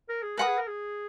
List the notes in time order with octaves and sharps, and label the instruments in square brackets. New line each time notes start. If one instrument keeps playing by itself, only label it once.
[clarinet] A#4
G#4
[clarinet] A#4 [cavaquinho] B4 F#5 B5 D#6
[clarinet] G#4
A#4
G#4